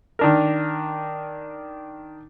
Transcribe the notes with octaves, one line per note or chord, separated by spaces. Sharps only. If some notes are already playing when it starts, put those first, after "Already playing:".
D#3 D4 A#4